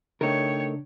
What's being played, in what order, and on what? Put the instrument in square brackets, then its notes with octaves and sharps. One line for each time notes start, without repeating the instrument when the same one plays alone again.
[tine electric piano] C#3 D4 [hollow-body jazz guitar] A3 D#4 A#4 [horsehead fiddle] C#5 G5